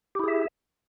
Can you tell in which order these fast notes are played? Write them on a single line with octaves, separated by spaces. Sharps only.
G4 E4 G#4 E5